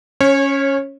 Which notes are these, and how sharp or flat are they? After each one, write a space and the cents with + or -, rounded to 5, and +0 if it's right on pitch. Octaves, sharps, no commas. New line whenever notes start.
C#4 +0 C#5 -25